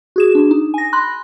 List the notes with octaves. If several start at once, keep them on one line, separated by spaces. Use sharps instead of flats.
F#4 G#4 E7
D4
D#4
G#5 A#6
B5 C6 F#6